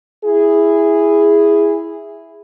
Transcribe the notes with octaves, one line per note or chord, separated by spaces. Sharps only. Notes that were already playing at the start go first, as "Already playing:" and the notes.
E4 G#4